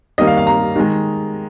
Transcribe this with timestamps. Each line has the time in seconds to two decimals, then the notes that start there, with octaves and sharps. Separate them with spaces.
0.18 D#3 G3 A#3 D#5
0.27 F5
0.37 F5
0.47 A#5
0.76 D#3 G#3